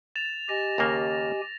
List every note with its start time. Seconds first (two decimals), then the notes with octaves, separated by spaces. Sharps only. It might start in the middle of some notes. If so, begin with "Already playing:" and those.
0.16 A6 E7 F7
0.49 G4 D#5 G#5 A#6
0.78 D#2 C#3 A#3